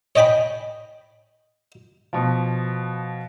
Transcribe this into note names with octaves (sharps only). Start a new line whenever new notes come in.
C#5 D#5 G5 G#5 B5
B2 F3